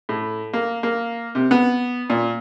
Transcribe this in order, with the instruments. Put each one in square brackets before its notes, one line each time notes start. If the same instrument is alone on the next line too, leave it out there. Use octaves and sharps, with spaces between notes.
[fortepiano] A2
A#3
A#3
C3
B3
A#2